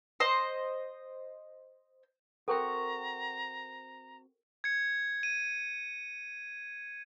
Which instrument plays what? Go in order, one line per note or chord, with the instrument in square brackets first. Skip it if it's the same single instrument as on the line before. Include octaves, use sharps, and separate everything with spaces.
[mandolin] C5 D#5
[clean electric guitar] C4 F#4 [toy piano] A4 A#4 G5 [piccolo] A#5
[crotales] G#6 C#7
D#7